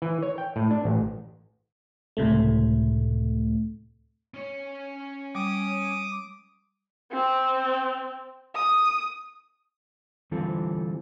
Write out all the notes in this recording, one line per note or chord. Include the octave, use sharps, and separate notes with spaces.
E3
C#5
G5
A2
D4
A1
C#2 A2 C3 A3
C#4 C#5
G3 D6 D#6
C4
D#6
D3 E3 G3 C4 F4 A4